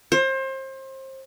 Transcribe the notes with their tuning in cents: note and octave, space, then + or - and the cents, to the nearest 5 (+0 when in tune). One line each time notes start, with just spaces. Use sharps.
C5 +30